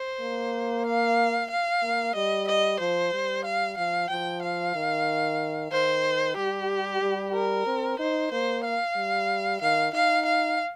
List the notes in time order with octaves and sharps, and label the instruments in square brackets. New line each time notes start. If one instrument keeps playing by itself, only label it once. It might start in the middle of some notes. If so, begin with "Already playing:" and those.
Already playing: [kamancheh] C5
[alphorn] A#3
[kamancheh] F5
F5
[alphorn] A#3
[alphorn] G3 [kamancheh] D#5
[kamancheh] D#5
[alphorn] F3 [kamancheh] C5
[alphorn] G3
[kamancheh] F5
[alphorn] F3 [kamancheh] F5
[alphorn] F3 [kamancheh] G5
[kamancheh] F5
[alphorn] D#3
[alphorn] D#3 [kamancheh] C5
[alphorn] G3 [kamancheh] G4
[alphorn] G3
[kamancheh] A#4
[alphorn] C4
[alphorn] D#4 [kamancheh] C5
[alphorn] A#3 [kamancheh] C5
[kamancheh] F5
[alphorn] G3
[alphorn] D#3 [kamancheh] F5
[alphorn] D#4 [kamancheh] F5
[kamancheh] F5